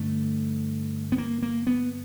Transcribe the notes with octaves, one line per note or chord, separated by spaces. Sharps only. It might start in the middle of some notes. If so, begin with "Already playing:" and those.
Already playing: G2 D3 A3
B3
A#3
A#3
B3